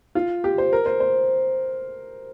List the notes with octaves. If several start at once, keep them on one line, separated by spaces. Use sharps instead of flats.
F4
G4
C5
A#4
C5
C5